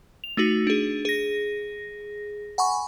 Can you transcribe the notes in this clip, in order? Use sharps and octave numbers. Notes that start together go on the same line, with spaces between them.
F7
A3 D#4 F#4
D4 G#4
G#4 A#6
F#5 G#5 B5 C#6